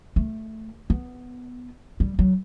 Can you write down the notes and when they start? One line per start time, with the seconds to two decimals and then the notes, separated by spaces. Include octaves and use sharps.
0.16 A3
0.90 B3
2.00 G3
2.19 F#3